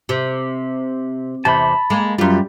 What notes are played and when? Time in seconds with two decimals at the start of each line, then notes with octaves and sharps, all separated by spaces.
0.09 C3
1.45 E2 C3 A5 B5
1.90 G#3 A#3
2.18 F#2 G3 F4